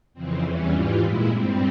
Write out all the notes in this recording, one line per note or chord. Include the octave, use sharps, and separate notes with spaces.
F2 C#3 E3 C4
E2 E3 G3 C#4
G#2 E3 G3 F4
A#2 G#3 E4
G2 G3 C4